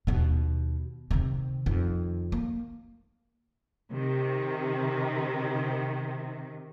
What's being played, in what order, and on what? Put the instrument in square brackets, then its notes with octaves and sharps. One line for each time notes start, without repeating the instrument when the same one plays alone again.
[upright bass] D#2 B2
C3 D#3
F2 D#3
A#3
[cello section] C3 D#3